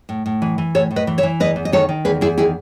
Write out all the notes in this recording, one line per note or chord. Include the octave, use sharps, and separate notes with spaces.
A2
A2
E3
E3
A2 A4 C#5
A2
B4 D#5
E3
C#5 E5
E3
E2 B4 D#5
E2
D#5
D#3 A4 C#5
D#3
E2 G#4 B4
E2 E4 G#4
D#3 E4 G#4